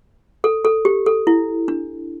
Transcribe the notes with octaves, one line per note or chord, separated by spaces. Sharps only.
A4
A4
G4
A4
E4
D4